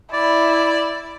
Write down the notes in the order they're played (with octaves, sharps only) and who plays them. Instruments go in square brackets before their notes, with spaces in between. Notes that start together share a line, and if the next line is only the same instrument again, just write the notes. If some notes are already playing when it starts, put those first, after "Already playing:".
[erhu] E4 [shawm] D5